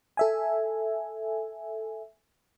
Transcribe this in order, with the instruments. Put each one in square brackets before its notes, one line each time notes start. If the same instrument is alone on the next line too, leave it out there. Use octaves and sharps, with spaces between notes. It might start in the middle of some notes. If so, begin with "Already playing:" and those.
[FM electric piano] A4 E5 G#5